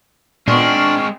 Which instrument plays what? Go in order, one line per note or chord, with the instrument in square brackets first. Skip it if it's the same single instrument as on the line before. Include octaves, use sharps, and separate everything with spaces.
[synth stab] A#2 B3 [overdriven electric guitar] G#3 C4 [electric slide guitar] D4 [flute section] C#6 F6